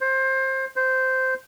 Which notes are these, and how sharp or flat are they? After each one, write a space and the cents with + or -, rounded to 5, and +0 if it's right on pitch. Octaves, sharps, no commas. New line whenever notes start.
C5 +20
C5 -10